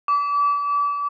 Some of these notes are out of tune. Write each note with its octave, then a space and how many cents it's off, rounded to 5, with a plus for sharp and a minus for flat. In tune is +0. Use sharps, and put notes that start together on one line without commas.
D6 -35